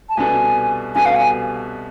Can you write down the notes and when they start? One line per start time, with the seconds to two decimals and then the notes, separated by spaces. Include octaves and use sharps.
0.09 A5
0.17 C2 B2 B3 D4 A4 G#5
0.95 C2 B2 B3 D4 A4 G#5
1.06 F5
1.16 G#5